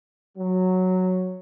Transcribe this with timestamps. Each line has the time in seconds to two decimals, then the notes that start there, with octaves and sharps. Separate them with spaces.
0.36 F#3